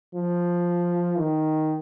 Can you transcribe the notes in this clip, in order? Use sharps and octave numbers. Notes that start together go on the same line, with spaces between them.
F3
D#3